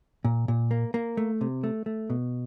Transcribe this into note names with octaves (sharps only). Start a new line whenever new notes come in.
A#2
A#2
A#3
A#3
A3
C3
A3
A3
B2